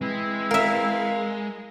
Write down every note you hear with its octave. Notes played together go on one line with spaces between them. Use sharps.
E3 G#3 C4 E4
A#4 E5 F5